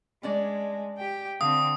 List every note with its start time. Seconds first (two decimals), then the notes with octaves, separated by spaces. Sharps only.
0.23 G#3 C#4 D4 D5
0.98 G4 G5
1.41 D3 C4 F5 D#6